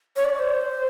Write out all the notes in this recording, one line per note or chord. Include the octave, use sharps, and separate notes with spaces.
C#5
D5
C5